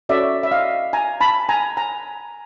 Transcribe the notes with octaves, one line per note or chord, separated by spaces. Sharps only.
C#4 F#4 A4 C#5 D5 E5
E5
D#5 F5
G#5 A#5
A5 B5
G#5 A#5
G#5 A#5